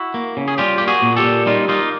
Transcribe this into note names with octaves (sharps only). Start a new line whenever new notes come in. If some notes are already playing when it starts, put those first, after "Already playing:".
Already playing: E4 F#4
A#3
C#3
G#4
G3 F4 G4
A#3 G4
F#4 G#4
A#2
G4 A4
A#2
G3 D#4 F4
A#3 D#4 F4